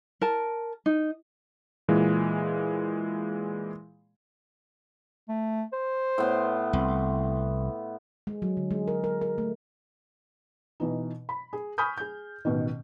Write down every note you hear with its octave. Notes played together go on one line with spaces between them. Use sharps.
A#4 A5
D#4
A#2 E3 G#3
A3
C5
A2 B3 C6
C2 C4
G#3
F#3
D3
G#3
A#4
A#4
A#4
A3
B2 E3 D#4
B5
G#4
G#5 B5 C#6 D#6 F6 G6
G#4 G6
A1 B2 D#3